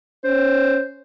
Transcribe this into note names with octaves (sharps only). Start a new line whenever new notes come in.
C#4 C5